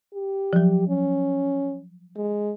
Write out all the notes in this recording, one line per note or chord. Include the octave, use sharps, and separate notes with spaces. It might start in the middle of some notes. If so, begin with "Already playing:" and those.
G4
F3 F#3
C#4
G#3